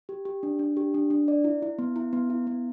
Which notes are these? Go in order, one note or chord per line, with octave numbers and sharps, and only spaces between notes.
G4
G4
D4
D4
G4
D4
D4
D5
E4
E4
B3
E4
B3
E4
B3